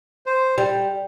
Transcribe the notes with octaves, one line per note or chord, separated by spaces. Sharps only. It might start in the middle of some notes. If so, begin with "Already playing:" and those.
C5
G3